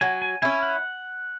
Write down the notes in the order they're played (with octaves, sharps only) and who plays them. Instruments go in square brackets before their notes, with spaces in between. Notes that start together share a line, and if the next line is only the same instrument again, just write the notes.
[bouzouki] F#3 [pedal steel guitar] G#5
[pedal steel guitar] G#5
[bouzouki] C#4 E4 [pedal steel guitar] G#5
[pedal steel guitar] F#5